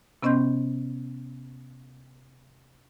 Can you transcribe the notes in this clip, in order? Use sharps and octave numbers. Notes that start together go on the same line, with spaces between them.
C3 B3 C#4 D#5 C6 G6